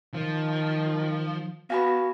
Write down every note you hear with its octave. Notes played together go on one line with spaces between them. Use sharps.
D#3 F3
B3 F#4 F5 G#5 B5